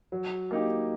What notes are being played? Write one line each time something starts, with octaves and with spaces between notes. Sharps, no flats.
F#3
A#3 D#4 G4